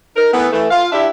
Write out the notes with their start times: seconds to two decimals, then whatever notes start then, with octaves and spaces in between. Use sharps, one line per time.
0.16 D#4 A#4
0.33 E3 A3 B3
0.53 E3 A3
0.71 F4 F5
0.92 D4 E4 G4 D5 E5